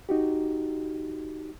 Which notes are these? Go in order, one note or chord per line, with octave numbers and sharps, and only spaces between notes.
D#4 F#4 G4